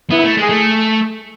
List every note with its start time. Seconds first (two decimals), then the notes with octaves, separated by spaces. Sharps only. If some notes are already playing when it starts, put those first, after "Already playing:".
0.11 B3 E4
0.23 A3
0.37 G#3 G#4
0.49 A3